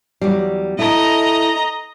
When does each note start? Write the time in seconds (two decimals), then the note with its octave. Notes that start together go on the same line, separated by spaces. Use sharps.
0.21 E2 F#3 G3
0.79 E4 A4 D#5 A#5